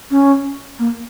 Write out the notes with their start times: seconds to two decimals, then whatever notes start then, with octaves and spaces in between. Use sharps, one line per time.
0.11 C#4
0.79 A#3